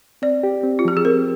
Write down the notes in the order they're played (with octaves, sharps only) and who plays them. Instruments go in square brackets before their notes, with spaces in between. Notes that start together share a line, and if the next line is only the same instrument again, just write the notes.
[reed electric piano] C4 [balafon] D5
[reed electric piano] G4
C4
[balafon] F4
[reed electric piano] F3 [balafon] G4
[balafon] G#4
[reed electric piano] C4 [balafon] A#4